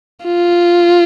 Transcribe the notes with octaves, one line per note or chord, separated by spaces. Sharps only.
F4